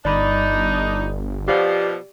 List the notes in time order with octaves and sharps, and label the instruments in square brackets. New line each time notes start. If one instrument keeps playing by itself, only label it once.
[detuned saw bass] G1 [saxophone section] D4 D#4 [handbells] D5 B5
[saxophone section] B2 F3 [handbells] G4 D5 C7